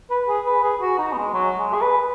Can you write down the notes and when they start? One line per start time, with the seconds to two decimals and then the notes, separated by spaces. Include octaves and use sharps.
0.10 B4
0.28 G#4
0.46 B4
0.63 G#4
0.81 F#4
0.99 D#4
1.13 B3
1.17 G#3
1.34 F#3
1.59 G#3
1.74 G#4
1.82 B4